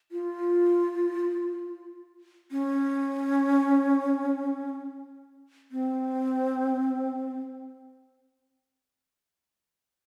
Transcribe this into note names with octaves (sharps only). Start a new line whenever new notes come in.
F4
C#4
C4